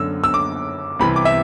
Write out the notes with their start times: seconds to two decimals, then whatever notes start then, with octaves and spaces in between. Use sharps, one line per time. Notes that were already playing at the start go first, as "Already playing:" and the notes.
Already playing: F#2 D3 E6
0.24 E6
0.34 D6
1.00 C2 C3 E3 B5
1.16 D6
1.25 E5